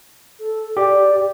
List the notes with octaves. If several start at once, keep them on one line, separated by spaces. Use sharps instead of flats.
A4
G4 D5